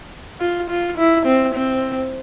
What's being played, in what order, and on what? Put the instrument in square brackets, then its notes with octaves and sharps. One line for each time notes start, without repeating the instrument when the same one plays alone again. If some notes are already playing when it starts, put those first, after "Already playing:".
[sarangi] F4
F4
E4
C4
C4